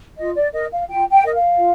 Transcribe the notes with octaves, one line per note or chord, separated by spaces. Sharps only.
F4 D#5
D5
A#4 D#5
F5
F4 G5
G5
A#4 D#5
F5
F4